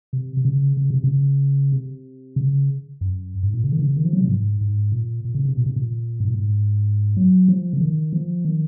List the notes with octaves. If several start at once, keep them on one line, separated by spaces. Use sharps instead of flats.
C3
C3
C#3
C#3
C3
C#3
C3
C#3
F#2
G#2
A#2
C#3
D#3
C#3
D#3
F3
F#3
C3
G#2
G#2
A#2
A#2
C#3
C3
A#2
C3
A#2
G#2
A#2
G#2
F#3
F3
C#3
D#3
F3
D#3